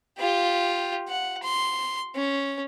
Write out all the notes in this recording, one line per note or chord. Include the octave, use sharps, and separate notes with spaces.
F4 G4
F#5
C6
C#4